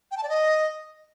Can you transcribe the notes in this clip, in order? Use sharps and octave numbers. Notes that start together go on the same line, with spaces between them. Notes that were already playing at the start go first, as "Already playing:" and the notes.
G5
A5
D5
D#5